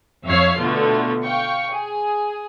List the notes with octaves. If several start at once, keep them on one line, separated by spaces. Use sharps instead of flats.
F2 C#5 E5 F5 C#6 C7
B2 D3 A3 B3 F4
F5 G5 C#6
G#4